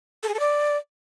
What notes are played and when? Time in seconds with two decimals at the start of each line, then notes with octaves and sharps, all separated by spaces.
0.23 A4
0.29 G#4
0.34 A4
0.40 D5